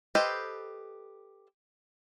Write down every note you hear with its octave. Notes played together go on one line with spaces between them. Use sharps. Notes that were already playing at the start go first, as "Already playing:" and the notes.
G4 A4 B4 C5 D#5